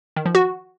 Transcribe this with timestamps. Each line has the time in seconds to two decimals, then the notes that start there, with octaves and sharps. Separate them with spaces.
0.16 D#3
0.26 F3
0.35 F#4